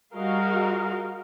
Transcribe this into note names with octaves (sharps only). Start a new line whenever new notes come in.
G3 F#4 G#4 A#4 D#5 F5